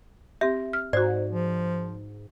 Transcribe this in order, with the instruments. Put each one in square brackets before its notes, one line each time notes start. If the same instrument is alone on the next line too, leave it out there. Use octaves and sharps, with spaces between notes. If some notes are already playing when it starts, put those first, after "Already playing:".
[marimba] C4 G4 [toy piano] E5
[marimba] F6
[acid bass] G#2 [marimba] F#4 C5 [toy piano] D5
[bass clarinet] F3